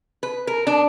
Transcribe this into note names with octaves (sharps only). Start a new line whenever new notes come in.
B4
A#4
D4